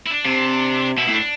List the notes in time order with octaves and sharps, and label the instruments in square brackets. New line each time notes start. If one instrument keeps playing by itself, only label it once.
[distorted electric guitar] E4
D4
[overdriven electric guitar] C3
[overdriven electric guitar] B2 [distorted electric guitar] E4
[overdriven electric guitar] A2
[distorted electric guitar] D4